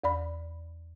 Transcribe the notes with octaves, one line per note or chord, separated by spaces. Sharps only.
E2 D5 B5